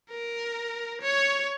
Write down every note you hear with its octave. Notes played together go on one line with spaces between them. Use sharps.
A#4
C#5